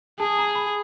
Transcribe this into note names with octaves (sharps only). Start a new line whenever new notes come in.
G#4 A5
A#5
B5